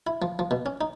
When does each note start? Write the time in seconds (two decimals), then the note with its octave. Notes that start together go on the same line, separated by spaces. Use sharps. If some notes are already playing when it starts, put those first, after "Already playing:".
0.07 E4
0.22 F3
0.39 F3
0.51 B2
0.66 C#4
0.81 D#4